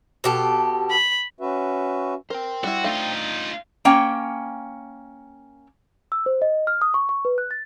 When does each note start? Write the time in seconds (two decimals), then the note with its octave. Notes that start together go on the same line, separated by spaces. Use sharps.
0.24 B2 G4 A4
0.91 B5
1.40 C#4 F#4 B4 E5
2.30 A#4 C5 G5
2.64 G3 E4 F#4
2.84 A3 D4 D#4 F4 F5
3.85 A#3 C#4 G5
6.12 E6
6.26 C5
6.42 D#5
6.67 F6
6.82 D#6
6.94 C#6
7.09 C#6
7.25 B4
7.38 F#6
7.51 A6